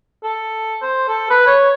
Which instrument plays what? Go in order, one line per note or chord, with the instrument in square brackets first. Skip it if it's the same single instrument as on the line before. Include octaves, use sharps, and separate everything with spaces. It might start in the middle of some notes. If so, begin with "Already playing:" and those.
[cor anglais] A4
C5
A4
B4
C#5